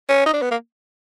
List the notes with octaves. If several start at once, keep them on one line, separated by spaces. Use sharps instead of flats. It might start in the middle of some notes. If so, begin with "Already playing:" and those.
C#4
D#4
D4
B3
A#3